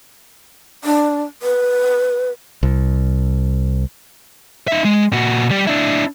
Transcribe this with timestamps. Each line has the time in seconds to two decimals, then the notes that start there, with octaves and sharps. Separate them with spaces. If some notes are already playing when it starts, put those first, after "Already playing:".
0.84 D4
1.43 B4
2.63 C2
4.68 D#4 E5
4.85 G#3
5.12 A#2 F#4
5.51 G3 G4
5.67 D4 E4